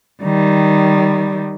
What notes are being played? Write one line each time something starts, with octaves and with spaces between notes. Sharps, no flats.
D#3 G3